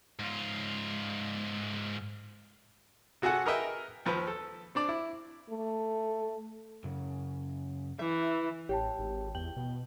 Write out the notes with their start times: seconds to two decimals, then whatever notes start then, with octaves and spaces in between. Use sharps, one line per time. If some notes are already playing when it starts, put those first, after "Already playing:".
0.19 G#2 F4
3.22 C3 F#4 G#4 A4 F#5
3.46 G#4 A#4 B4 D#5 E5 G5
4.06 D#2 F3 B4
4.27 A4
4.75 C4 D4 D5
4.89 E4
5.49 A3
6.84 F#2 C#3
7.99 E3 E5
8.69 A1 G4 C#5 G5 A5
8.99 G#1
9.35 E2 G5 F#7
9.56 B2